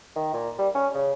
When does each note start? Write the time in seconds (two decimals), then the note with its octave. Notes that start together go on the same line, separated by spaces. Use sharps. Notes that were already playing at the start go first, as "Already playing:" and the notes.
0.16 D#3
0.33 A#2
0.58 G3
0.75 C#4
0.94 C#3